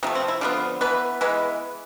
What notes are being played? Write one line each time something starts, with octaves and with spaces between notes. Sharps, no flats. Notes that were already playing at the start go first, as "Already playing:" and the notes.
C3 F3 A3 B3
C4
E4
D3 F3 G#3 B3 F4
E3 B3 B4
E3 G#3 B3 B4